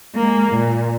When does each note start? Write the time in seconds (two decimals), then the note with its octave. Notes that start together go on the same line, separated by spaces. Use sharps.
0.15 G#3 A#3
0.52 A#2